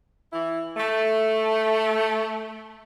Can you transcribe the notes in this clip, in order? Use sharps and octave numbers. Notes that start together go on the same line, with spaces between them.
E3 E4
A3